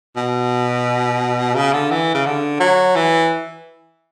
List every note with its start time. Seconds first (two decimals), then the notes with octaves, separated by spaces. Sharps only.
0.16 B2
1.55 C#3
1.73 D3
1.91 E3
2.14 C#3
2.26 D3
2.60 F#3
2.96 E3